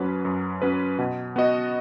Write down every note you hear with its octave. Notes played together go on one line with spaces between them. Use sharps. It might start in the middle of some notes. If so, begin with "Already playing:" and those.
Already playing: F#2 F#3 C#4 B4
F#2
F#3 C#4 B4
B2
B3 F#4 D#5